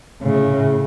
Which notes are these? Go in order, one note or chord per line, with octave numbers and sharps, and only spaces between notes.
A2 C#3